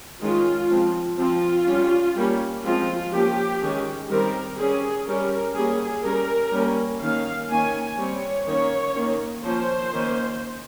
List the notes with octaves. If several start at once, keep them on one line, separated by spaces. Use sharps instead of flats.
D#3 G#3 C#4 F4
F3 G#3 C4
F3 C4 F4
G3 C#4
G3 A#3 C#4
F3 G#3 C4 F4
F3 A#3 C#4 G4
D#3 G#3 C#4
D#3 G3 C4 A#4
G3 C#4 G#4
G3 C#4 A#4
G3 A#3 C#4 G#4
G3 C#4 A#4
G3 A#3 C#4
D#3 A#3 C#4 F5
D#3 A#3 C#4 G#5
G3 C4 C#5
D#3 A#3 C#4 C#5
D#3 A#3 C#4
F3 A#3 C#4 C5
D#3 A#3 C#4